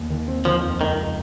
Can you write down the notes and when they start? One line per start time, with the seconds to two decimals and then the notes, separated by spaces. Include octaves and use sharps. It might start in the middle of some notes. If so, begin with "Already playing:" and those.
Already playing: D#2
0.10 D#3
0.28 C4
0.45 D#3 F3
0.63 F2
0.80 C#2 D#3